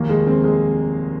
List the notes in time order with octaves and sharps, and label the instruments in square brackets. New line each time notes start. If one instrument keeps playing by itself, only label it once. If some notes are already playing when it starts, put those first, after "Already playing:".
Already playing: [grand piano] F1 D#2 D#3 A#3
[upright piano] G#3
C4
G#3